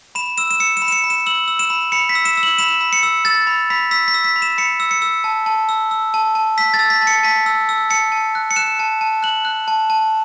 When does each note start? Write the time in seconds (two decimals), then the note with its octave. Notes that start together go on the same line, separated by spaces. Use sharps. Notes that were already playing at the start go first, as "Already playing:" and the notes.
0.15 B5 E7
0.38 E6 E7
0.51 E7
0.60 E6 C#7
0.77 E7
0.82 B5
0.88 E7
0.92 C#7
1.04 B5
1.10 E7
1.26 E6 F#7
1.48 E6
1.59 E7
1.70 B5
1.92 B5 C#7
2.09 B6
2.15 E6
2.25 E7
2.37 E6
2.43 F#7
2.58 B5 E7
2.81 B5
2.93 C#7
3.03 E6
3.25 E6 A6
3.47 B5
3.70 B5 B6
3.91 E6 B6
4.08 B6
4.14 E6
4.24 B6
4.36 B5
4.42 E7
4.58 B5 C#7
4.80 E6
4.91 C#7
5.02 E6
5.24 A5
5.46 A5
5.69 E6
5.91 E6
6.14 A5
6.35 A5
6.58 E6 B6
6.74 A6
6.79 E6
6.90 B6
7.02 A5
7.07 C#7
7.23 A5 B6
7.46 E6
7.69 E6
7.90 A5 C#7
8.12 A5
8.35 F#6
8.51 C#7
8.56 F#6 E7
8.80 A5
9.01 A5
9.23 F#6 F#7
9.45 F#6
9.68 A5
9.90 A5